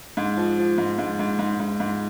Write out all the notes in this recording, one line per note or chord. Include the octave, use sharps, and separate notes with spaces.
G#2
F3
F3
G#2
G#2
G#2
G#2
G#2
G#2